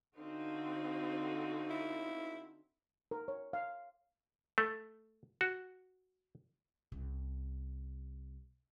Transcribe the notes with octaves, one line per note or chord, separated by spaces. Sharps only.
D3 C4 D#4 F#4 F5
E4
A#4
C#5
F5
A3
F#4
C2 C#4